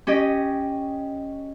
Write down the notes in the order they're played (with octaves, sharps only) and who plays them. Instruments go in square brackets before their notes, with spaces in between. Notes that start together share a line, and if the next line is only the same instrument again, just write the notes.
[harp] C#4 G4 D#5